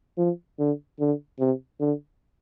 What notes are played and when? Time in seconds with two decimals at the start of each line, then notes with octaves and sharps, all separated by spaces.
0.18 F3
0.59 D3
1.00 D3
1.39 C3
1.80 D3